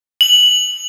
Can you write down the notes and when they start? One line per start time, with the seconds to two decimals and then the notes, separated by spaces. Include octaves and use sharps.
0.21 F#7